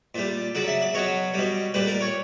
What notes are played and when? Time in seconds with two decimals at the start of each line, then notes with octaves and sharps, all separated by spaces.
0.15 A#2 G3
0.55 C#3 F#3 D5
0.68 E5
0.82 D5
0.94 B2 F#3 C#5
1.34 B2 G3
1.74 A#2 G3 B4
1.88 A#4
2.01 C#5